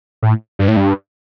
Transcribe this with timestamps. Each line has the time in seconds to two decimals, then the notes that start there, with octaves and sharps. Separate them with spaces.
0.23 A2
0.59 G2
0.68 A2
0.76 G2